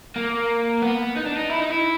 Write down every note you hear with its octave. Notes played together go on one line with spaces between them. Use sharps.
A#3
B3
D#4
D4
D#4
E4
D#4
E4